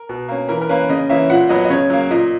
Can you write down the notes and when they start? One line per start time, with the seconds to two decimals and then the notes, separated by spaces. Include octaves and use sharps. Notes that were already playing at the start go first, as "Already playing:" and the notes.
Already playing: A#4
0.09 B2
0.28 A#3 C#4
0.49 E3 A#4
0.62 A#4
0.69 A#3 C#4 B4
0.89 C#3 D#5
1.09 E3 A#3 C#4 E5
1.30 A#2 F#5
1.49 F#3 B3 D#5
1.65 D#5
1.70 C#3 C#5
1.90 F#3 A#3
2.10 A#2 D#5